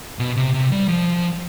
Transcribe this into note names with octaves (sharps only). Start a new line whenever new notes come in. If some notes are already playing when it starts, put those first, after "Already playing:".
B2
C3
C3
G3
F3